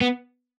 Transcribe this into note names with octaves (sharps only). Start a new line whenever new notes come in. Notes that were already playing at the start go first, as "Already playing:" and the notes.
B3